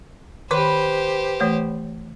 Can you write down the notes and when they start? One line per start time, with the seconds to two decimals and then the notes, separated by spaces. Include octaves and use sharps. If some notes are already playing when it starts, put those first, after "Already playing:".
0.51 D#3 G4 B4 C5 C6
1.40 E3 A3 C#5